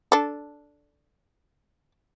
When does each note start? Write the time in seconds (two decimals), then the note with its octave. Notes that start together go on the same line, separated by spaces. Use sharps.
0.12 D4 A4